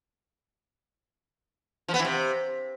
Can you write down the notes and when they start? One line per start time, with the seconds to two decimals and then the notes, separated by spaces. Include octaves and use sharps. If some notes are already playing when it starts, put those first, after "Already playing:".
1.88 F3
1.94 B3
1.99 E3
2.05 C3